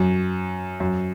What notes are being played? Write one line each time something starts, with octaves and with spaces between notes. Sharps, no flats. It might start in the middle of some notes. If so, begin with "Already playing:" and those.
Already playing: F#2
F#2